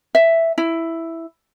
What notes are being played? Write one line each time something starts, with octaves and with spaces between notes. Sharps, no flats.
E5
E4